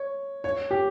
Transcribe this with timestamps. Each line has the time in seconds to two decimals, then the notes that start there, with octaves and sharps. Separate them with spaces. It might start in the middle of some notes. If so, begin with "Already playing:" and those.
Already playing: C#5
0.44 C#5
0.71 G4